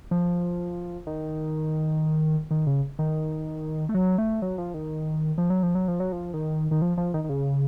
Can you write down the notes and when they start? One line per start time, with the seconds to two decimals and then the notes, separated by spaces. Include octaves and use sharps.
0.11 F3
1.07 D#3
2.51 D#3
2.67 C#3
2.99 D#3
3.89 A3
3.94 F#3
4.18 A3
4.42 F#3
4.58 F3
4.74 D#3
5.38 F3
5.50 F#3
5.63 F3
5.75 F#3
5.88 F3
6.00 F#3
6.12 F3
6.34 D#3
6.71 D#3
6.82 F3
6.97 F3
7.14 D#3
7.24 D#3
7.29 C#3